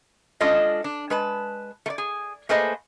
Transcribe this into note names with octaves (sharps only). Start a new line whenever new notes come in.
G#3 C#4 D4 F4 A4 D#5
D4
G#3 B4 A5
A3 D5
G#4
A3 A#3 G#4 B4 C5 D#5